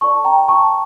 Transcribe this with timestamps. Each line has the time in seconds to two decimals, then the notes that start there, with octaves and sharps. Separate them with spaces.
0.01 E4 A4 D5 A5 C#6
0.24 G5 A#5
0.48 A5 C#6